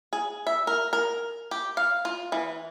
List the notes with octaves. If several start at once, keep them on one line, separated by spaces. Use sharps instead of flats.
G#4
E5
A#4
A#4
G4
F5
F4
E3